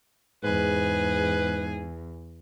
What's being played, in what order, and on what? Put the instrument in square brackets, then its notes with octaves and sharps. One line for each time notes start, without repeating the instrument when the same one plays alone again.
[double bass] E2 [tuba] G#2 [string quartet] G#4 [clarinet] B4